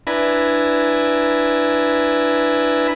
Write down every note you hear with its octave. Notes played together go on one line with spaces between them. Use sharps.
D4 E4 B4 G#5 A#5 B5